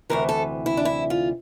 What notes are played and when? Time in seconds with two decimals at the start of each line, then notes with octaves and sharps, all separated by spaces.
0.10 D2 C3 E3 A#4
0.29 A4
0.66 E4
0.77 D4
0.85 E4
1.10 F4